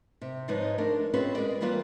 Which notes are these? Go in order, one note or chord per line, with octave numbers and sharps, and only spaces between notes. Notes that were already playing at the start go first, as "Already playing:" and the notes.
C3
G#2 F3 G#3 D#4 B4 C#5
G#3 A3 D4 A#4
C4 C#4 F4 G#4 B4
G#3 G#4 A#4 D5
E3 G3 A#3 F4 B4